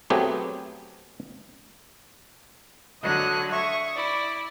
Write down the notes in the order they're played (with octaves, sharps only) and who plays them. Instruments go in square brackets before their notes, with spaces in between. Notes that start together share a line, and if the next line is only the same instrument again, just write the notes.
[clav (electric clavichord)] F#3 A3 B3 C4 G4 G#4
[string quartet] D3 F#3 [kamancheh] D#5 F#6
[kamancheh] E5 D#6 [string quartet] C#6
[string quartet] E4 [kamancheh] D5